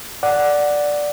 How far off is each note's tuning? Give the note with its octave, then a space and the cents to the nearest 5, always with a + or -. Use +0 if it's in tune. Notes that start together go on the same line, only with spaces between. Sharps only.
D5 +0 F#5 +0